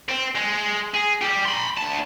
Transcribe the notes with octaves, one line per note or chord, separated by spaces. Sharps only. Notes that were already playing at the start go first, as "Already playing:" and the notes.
C4
G#3
G#4
G3 G4
B5 C6
D2 A5